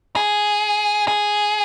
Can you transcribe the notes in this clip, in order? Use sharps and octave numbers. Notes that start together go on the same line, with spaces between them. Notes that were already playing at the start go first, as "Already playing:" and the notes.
G#4
G#4